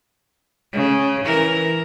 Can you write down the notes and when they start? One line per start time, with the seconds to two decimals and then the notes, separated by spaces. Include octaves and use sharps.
0.73 C#3
1.25 E3 A#4